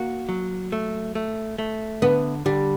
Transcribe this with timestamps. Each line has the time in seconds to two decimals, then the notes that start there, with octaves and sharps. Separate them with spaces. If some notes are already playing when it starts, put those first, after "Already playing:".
Already playing: A#3 F#4
0.29 F#3
0.72 A3
1.15 A3
1.58 A3
2.02 D3 B3
2.46 D3 G3